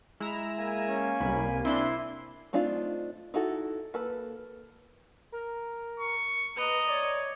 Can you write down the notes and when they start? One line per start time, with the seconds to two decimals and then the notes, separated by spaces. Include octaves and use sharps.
0.20 G#3 E4 A#5 E7
0.58 A#3 G#5
0.88 C#4
1.20 C2 B5
1.65 C4 D4 E4 C6
2.53 A3 C4 D4 D#4 F4
3.34 D#4 E4 F#4 A4
3.94 A#3 A4 B4
5.32 A#4
6.00 C#6
6.57 B4 D#5 A#5
6.88 C#5 D5